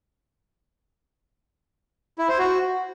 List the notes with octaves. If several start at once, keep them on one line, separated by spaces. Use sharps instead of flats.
E4
C5
F#4